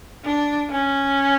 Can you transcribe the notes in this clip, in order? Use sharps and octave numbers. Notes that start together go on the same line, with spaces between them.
D4
C#4